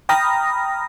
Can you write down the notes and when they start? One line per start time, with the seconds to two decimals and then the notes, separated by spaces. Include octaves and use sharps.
0.09 G5 A#5 B5 D#6 F6 A#6